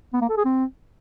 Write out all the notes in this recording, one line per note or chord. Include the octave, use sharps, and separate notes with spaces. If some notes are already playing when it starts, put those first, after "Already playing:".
B3
A#3
A4
G#4
C4